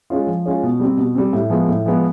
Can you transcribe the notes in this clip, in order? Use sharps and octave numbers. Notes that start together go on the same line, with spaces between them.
G#3 C#4 F4
F3
G#3 C#4 F4
B2
G3 C4
B2
G3 C4
A2
F3 G#3 B3
A2
F3 G#3 B3